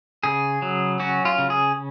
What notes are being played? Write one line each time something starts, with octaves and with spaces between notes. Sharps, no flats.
C#3 G#4
F#3
C#4 F#4
F4
C#3
G#4